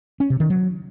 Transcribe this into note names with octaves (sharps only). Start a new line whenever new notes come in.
C#4
C3
D#3
F#3